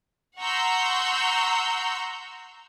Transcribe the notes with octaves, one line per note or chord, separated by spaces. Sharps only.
F#5 A#5 C6 C#6 E6 G6